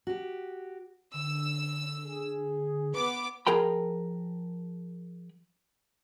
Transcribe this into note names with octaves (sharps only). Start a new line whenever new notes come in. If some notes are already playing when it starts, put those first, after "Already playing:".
F#4 G4
D3 E6
G#4
B3 B4 D6
F3 G#4 A#4 G5 B5